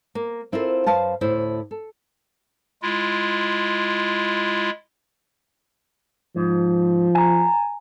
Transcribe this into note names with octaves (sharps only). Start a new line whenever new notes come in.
A#3
C4 E4 F4 A4 A#4 C5
F#2 B4 C5 F5 A5
D2 A2 E4 C5
A4
G#3 E4 F4
G#2 F3
G#5 A#5